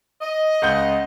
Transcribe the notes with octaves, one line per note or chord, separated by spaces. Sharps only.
D#5
C#2 F#5 G6